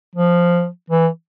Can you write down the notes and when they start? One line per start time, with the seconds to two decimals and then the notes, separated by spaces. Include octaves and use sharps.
0.16 F3
0.90 E3